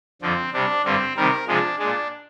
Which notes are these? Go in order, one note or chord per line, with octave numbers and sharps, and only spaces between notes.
F2 D3 F3 C4
C3 G3 D4
G2 D3 G3 C4
C3 D#3 G3 A#4
C3 F3 G#3 D4
A#2 G#3 D4